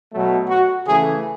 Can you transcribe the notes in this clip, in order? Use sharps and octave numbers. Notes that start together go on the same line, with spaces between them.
B2 F#3 A3
F#4
C#3 E3 A3 G#4